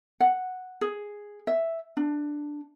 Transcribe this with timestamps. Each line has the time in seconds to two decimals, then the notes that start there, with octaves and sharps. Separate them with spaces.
0.20 F#5
0.81 G#4
1.47 E5
1.97 D4